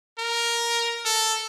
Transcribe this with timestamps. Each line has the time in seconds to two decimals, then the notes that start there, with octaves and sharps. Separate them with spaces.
0.19 A#4
1.05 A4